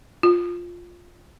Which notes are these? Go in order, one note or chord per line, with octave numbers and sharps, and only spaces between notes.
F4